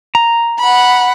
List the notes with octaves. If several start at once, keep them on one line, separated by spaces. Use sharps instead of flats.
A#5
F#5 B5